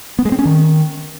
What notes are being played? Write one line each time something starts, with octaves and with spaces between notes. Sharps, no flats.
B3
G#3
C4
C#4
D#3